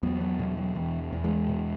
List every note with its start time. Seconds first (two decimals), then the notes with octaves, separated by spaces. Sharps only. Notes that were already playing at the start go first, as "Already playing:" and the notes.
0.03 E2 F#3 B3
0.20 F#3 B3
0.39 B2 F#3
0.57 F#3
0.75 E2 E3
1.12 E2
1.24 E3 G#3
1.48 B2